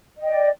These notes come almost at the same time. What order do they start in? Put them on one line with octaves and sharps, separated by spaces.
D#5 G5 D5